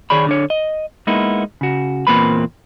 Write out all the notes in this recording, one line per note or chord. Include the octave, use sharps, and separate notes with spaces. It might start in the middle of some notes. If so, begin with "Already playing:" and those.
D#3 G#4 C#5 D5 B5
D3 D4 C#5
D#5
G#3 A#3 B3 D#4 E4
C#3 F#4
E2 A#2 A#3 C4 B4 B5